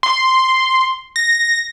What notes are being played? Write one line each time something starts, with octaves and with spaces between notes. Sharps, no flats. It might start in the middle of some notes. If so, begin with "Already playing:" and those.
C6
A#6